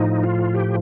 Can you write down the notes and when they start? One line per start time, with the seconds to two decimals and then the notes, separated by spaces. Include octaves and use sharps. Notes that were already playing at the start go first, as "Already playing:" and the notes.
Already playing: A2 F3 D#4
0.23 F4
0.54 G4